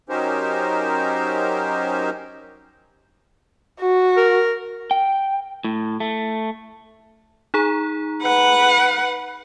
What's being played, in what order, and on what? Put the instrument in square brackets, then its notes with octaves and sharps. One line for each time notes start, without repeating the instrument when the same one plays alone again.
[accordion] F#3 C#4 D#4 G4 A#4 C5
[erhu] F#4
[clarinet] A#4
[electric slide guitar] G5
A2
A3
[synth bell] D#4 G#4 A#5
[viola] B4 F#5